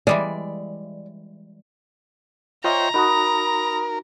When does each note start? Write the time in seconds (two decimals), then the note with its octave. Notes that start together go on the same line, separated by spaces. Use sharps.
0.07 E3 G3 G#3 D5
2.64 F4 C5 C#5 D#5 E5 G5 A#5
2.94 D#4 F#4 A#4 B5 D#6